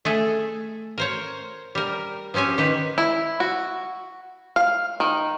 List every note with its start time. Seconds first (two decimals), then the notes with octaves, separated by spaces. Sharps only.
0.05 A3 G#4 A4
0.98 A#4 C5 C#5
1.75 G3 A#4
2.34 F3 C4 C#4 G4 G#5
2.58 D#3 G4 B4
2.98 E4
3.40 F#4
4.56 F5
5.00 D#3